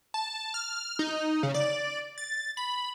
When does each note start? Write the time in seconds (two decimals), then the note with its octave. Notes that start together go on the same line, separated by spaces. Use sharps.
0.14 A5
0.54 F6
0.99 D#4
1.43 C#3
1.54 D5
2.18 A6
2.57 B5